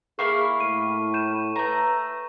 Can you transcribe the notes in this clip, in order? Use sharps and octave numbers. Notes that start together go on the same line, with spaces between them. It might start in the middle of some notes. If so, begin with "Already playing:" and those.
A#3 E4 G#4 F5 C#6
A2 D#7
G6 D#7 E7
A3 B4 A#5